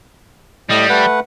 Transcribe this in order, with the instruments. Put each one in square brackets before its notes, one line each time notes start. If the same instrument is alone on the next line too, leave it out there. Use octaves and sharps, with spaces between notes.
[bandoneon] A2 D#5 [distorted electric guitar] G3
[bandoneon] A3 B4 F#5